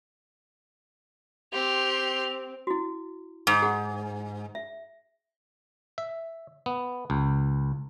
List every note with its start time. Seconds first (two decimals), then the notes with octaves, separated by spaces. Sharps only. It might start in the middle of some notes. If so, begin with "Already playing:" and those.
1.53 C4 G4 C6 F7
2.67 E4 F#4
3.47 G#2
3.62 G#4 F#5
4.55 E5
5.98 E5
6.66 B3
7.10 C#2